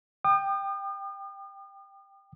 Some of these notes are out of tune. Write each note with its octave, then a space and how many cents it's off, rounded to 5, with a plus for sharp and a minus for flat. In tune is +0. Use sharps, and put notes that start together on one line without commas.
G5 +5 D#6 -45